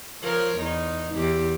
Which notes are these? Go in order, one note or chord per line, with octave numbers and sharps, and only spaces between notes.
F3 A#4 C#5
E2 D#4
E2 E3 G4